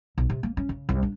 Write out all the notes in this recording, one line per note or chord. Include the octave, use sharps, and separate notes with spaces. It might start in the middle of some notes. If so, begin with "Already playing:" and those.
B1
C3
A#3
C#4
C#3
C2
D4